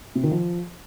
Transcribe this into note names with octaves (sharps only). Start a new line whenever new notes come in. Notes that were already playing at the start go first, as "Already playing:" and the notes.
C3
D#3
F3